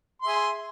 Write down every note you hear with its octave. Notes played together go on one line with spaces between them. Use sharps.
G#4 E5 C6